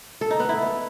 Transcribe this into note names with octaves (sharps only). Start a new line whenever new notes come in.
A4
D#4
B3
E4